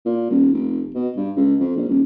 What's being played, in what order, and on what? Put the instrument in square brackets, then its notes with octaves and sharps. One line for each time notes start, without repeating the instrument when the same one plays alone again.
[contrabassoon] A#2
D#1
F1
B2
G2
C#2
F2
A#1
D#1